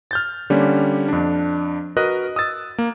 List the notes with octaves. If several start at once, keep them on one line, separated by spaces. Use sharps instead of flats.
F6 G6 A6
D3 G3 A#3 C#4
F2 D4
F#4 A#4 B4 D#5 F#6
D#6 E6 A6
A#3